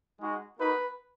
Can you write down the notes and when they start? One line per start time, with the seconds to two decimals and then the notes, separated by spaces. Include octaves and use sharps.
0.20 G#3 D#4 F#4
0.59 A#3 D#4 F#4 B4